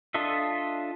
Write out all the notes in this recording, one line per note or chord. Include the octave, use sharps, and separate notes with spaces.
D4 F4 A4 D#5 E5